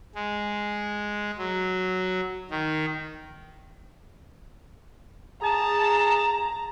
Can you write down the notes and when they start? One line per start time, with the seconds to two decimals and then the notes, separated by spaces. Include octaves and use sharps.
0.15 G#3
1.38 F#3
2.51 D#3
5.42 G#4 A5 A#5